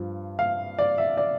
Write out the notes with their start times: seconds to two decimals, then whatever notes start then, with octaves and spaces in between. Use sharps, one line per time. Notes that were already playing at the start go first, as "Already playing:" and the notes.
Already playing: G2 F3
0.39 F5
0.79 D5
0.98 E5
1.17 D5